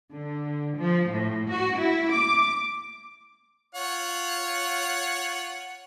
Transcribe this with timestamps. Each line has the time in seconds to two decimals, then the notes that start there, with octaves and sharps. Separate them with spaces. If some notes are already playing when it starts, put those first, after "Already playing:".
0.13 D3
0.77 F3
1.09 A2
1.50 F#4
1.79 E4
2.15 D6
3.75 F4 C#5 F#5